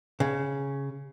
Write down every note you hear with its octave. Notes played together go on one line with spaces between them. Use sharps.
C#3